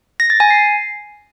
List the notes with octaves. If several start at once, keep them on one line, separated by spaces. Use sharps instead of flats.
A#6
A6
G#5
C7